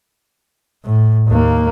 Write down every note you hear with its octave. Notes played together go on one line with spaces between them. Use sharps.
A2
D#2 A#3